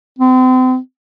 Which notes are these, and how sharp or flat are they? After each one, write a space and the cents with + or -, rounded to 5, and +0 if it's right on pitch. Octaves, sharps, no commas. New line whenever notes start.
C4 -35